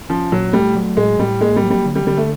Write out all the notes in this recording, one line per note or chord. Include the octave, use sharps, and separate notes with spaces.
F3 C#4
A#2 F#3
G3 A3
F#3
A2 G#3
A2 G3
G#3 A#3
G3
F#3
G3
D3
G3
D3 G3
A3